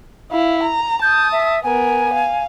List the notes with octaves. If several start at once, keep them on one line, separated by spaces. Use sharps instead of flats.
E4 F5
A#5
A5 D#6 G6
E5
B3 A#4 G#5
F5